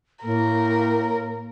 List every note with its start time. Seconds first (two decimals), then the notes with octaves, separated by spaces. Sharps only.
0.24 A2 A#3 A#4